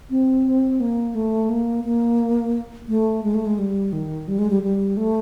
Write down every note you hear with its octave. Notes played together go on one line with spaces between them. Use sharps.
C4
A#3
A3
A#3
A#3
A3
G#3
A3
G#3
G3
D#3
G3
G#3
G3
G3
A3